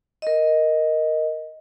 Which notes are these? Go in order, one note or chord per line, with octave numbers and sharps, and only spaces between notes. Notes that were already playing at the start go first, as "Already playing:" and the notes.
A#4 D#5